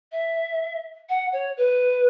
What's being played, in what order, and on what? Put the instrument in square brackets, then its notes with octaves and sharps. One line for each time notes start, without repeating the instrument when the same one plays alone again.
[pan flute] E5
F#5
C#5
B4